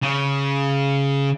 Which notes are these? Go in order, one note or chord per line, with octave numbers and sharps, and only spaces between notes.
C#3